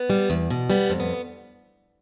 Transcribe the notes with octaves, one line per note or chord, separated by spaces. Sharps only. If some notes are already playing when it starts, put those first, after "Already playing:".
Already playing: B3
G3
E2
B2
G3 B3
F2
B3